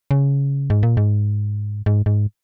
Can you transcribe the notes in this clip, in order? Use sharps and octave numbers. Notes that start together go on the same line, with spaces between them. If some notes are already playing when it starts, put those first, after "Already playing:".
C#3
G#2
A#2
G#2
G#2
G#2